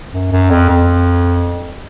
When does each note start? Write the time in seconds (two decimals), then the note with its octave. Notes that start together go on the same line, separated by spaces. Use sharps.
0.12 F#2
0.32 F#2
0.50 F2
0.70 F2